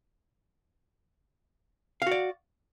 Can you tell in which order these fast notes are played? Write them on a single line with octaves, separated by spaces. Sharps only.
F5 F#4 D5